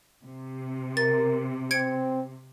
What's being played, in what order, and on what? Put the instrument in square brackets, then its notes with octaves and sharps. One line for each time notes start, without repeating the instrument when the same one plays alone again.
[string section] C3
[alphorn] A#4 [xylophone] A6
[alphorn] C4 [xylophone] G#6 C#7 D7